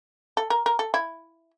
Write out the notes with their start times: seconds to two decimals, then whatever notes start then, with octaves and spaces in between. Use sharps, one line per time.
0.37 A4
0.50 A#4
0.66 A#4
0.79 A4
0.94 E4